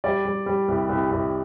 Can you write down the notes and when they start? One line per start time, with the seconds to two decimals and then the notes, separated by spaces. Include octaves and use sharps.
0.04 G3 D5
0.25 G3
0.46 G3
0.68 C2
0.89 C2
1.11 C2